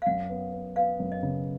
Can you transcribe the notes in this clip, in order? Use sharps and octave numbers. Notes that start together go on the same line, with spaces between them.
F5
F#2 F#5
B3
B3
B3 F5
F#2
D#5
C#3